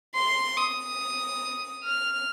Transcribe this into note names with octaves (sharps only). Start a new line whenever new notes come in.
C6
D#6
F6